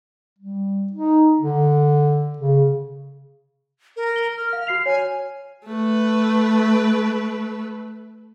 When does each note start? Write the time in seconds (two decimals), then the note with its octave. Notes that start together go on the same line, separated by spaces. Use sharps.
0.38 G3
0.92 D#4
1.41 D3
2.38 C#3
3.96 A#4
4.16 G7
4.38 F6
4.53 F5
4.67 F#4 C7 F7
4.86 C#5 G#5
5.67 A3 B4